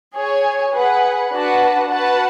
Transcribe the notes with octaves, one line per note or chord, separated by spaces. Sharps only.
G#4 C#5 G#5
G#4 B4 F#5
D4 F#4 B4 F#5 A5
F#4 B4 F#5 A5